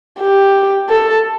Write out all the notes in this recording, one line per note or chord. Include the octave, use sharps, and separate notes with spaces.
G4
A4